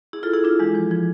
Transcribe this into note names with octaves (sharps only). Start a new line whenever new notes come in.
E4 G#4
F4 A4
E4 G#4
D4 F4
E3 G#3
F3
F3